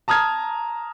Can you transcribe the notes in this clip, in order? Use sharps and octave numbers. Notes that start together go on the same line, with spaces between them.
A5 A#5 D#6 F6 G#6